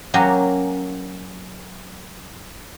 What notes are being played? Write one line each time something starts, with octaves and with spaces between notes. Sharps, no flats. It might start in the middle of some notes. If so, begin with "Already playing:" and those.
F#3 A#3 C#4 G4